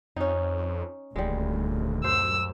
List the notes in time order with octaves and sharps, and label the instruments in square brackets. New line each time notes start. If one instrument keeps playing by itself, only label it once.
[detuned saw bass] F2 [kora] C#4 D#4
[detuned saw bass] D#1 [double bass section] D2 A#2 [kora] G3 G#3
[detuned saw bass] F#2 [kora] C5 [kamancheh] E6